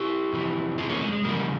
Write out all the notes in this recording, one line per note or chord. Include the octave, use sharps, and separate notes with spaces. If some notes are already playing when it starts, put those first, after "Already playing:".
Already playing: E4 G4
F2 C3 E3
F4 G#4
A#3 C#4
G#3
G#3
E2 C#3 F3 G3 A#3